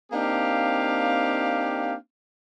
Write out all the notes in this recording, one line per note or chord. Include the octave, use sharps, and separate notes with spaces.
A#3 C4 D4 D#4 G4 F5